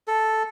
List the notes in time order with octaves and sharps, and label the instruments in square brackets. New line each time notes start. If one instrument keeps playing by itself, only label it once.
[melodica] A4